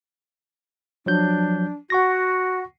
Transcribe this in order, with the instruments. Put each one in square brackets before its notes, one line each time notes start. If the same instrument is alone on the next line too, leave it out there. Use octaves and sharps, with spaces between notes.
[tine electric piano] F3 F#3 G6 [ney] D4
[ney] F#4 [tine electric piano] F#5 C#6 A#6